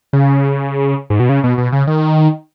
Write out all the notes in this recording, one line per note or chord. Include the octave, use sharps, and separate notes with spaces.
C#3
G#2
B2
C#3
B2
B2
C#3
D#3